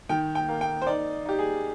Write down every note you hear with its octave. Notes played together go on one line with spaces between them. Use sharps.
D#3 G5
G5
A#3
G5
C5
D#4 D5
D#4 G4
G#4